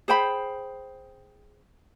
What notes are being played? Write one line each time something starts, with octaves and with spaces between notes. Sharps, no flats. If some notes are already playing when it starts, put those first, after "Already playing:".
G#4 C5 G5 B5